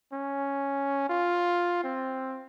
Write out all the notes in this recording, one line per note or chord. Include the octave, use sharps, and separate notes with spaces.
C#4
F4
C4